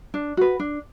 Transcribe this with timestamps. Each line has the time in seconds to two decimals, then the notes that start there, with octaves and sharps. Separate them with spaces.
0.14 D4
0.37 F#4 B4
0.60 D4